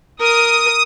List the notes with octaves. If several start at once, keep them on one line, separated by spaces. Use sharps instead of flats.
A#4 D#6